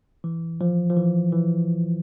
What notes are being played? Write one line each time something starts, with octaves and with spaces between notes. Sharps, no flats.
E3
F3
F3
E3
E3